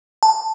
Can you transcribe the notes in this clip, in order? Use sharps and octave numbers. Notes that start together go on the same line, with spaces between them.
A5